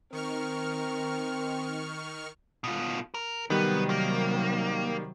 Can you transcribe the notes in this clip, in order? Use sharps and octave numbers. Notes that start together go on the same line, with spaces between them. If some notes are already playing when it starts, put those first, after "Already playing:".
D#3 C4 A#4 C#6 F6
B2 F4
A#4
C3 D#3 F#3 G3 B3
A#3